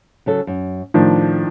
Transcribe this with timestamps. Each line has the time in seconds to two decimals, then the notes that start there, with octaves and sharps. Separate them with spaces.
0.26 C#3 F#3 A4
0.47 F#2
0.94 A2 D#3 F3 D4